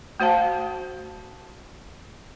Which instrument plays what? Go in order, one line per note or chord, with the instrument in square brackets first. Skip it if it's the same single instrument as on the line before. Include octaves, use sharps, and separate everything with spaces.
[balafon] A3 F#4 C5 F5 A5